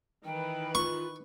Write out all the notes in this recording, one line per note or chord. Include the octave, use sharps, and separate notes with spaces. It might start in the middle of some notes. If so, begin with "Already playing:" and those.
D#3 E3 B4 G5
F4 C#6